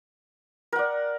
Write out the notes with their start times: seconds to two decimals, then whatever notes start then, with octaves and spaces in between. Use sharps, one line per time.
0.72 A#4
0.76 F#5
0.79 D5